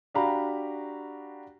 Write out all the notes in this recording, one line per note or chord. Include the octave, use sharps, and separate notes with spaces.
D4 F#4 G4 F5 A#5 B5